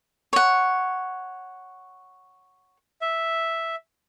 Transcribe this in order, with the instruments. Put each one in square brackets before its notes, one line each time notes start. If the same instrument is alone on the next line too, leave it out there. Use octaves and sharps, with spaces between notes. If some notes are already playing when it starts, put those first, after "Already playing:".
[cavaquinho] C#5 F#5
[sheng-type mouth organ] E5